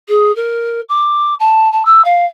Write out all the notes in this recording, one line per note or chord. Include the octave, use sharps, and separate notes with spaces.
G#4
A#4
D6
A5
A5
E6
F5